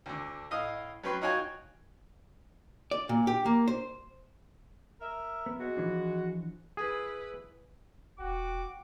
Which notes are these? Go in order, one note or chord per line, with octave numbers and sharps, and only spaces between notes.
D2 D3
A2 D#5 F5 D#6
F#3 C#4 B4 G5 C6
D#4 F4 F#4 C#5 G5 G#5
D5
A#2
G4
A#3
C5
A#4 E5
B3
F#3 G#3 F#4
E3 F3 D4
E4 G#4 B4
E1 F#4 G5 D6